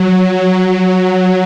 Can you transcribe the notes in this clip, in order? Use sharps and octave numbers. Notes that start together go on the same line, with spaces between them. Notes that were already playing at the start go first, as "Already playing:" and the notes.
Already playing: F#3